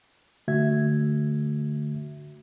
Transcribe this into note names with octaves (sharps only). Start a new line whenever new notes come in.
D3 A3 F#4 E5 G#6